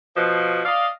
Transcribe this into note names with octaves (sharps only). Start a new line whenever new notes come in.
B2 F3
D5 D#5 F5